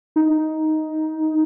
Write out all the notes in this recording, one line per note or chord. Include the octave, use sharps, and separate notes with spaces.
D#4